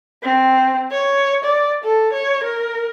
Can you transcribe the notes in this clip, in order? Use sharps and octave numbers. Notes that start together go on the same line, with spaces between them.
C4
C#5
D5
A4
C#5
A#4